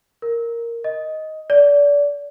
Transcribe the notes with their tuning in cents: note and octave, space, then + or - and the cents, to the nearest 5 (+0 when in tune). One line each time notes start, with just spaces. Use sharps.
A#4 +0
D#5 +10
D5 -30